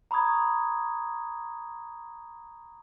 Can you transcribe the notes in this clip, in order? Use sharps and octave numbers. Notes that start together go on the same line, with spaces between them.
A#5 B5 C#6 D#6 G#6